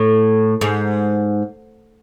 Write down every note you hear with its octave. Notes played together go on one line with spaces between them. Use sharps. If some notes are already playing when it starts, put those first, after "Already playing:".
Already playing: A2
G#2